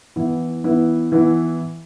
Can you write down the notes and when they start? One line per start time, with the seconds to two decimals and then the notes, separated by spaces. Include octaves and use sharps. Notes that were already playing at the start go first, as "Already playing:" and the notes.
0.16 E3 B3 E4
0.64 E3 B3 E4
1.12 E3 B3 E4